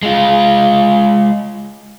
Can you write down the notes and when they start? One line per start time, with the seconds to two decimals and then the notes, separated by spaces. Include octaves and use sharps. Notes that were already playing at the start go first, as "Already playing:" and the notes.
0.03 G#3 F4